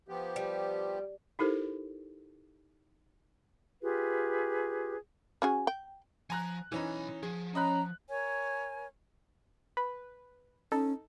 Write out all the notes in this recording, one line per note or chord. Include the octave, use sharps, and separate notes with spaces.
F3 B3 G4
G3
D#4 E4 G4 A4 A#4 C5
F4 G4 G#4 B4
C#4 F#4 G#4
G5
F3 G#5 A#5 F#6
B1 E3 C#4 D#4 B5
F3 G#4
C#4 D#5 A#5 B5 F#6
A#4 C#5 G#5
B4
C#4 D#4 A4